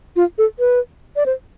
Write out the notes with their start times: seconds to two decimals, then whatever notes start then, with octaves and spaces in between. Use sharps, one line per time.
0.16 F4
0.38 A4
0.59 B4
1.16 D5
1.26 C5